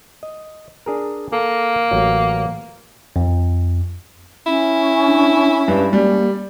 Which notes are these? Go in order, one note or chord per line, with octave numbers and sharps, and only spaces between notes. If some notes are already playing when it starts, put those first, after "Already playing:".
D#5
D4 G#4 A#4
A#3 A4 A#4 A5
A1 F#3
F2
C#4 E4
D4
G2 B4
G3 A#3